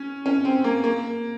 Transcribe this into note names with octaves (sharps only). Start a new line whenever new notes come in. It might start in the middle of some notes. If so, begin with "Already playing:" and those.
Already playing: C#4
C#4
C4
A#3
A#3